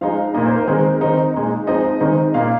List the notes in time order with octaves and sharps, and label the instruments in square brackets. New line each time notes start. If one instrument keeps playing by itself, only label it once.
[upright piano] F3 G#3 D#4 F5
A#2 A#3 D#4 D#5
C5
A#4
D#3 G#3 C4 D#4
D#3 C4 D#4
A#2 G#3 D#4
F3 G#3 C4 D#4 D#5
D#3 G#3 C4 D#4
A#2 A#3 D#4 F5